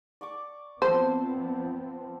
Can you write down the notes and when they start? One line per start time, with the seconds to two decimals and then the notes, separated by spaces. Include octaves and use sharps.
0.21 D5 C#6 D6
0.82 F3 B3 C4 A4 C5 A5 C6